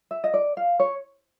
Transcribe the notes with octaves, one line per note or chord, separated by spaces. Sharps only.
E5
D#5
D5
F5
C#5